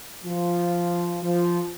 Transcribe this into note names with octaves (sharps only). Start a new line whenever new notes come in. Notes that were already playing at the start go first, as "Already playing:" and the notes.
F3
F3